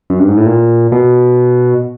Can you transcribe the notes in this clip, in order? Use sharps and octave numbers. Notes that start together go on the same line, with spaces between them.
F#2
G2
G#2
A2
A#2
B2